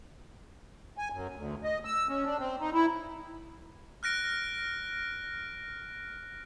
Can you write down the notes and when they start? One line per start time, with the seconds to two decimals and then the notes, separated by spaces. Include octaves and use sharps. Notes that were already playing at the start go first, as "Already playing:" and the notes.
0.98 G#5
1.12 F#2
1.36 D2
1.64 D#5
1.85 E6
2.09 C#4
2.25 D4
2.39 C4
2.60 D#4
2.73 E4
4.03 F6 F#6 A#6 D7